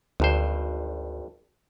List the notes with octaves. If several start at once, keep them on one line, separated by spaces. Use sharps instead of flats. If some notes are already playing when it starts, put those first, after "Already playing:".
G#1 D2 G2 C5